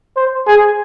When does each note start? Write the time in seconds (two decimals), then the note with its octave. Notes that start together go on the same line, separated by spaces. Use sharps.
0.16 C5
0.47 G#4